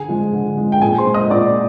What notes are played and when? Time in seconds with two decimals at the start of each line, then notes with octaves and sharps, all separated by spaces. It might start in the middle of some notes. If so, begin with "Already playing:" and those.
Already playing: D3 G#4 G#5
0.08 F3 G#3
0.33 D3
0.57 F3 G#3
0.72 G5
0.82 A#2 G#4 G#5
0.98 C5 C6
1.06 G#3
1.14 D#5 D#6
1.30 A#2 D5 D6